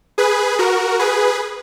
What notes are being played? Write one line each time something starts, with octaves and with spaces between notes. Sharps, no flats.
G#4 B4
F#4 A#4
G#4 B4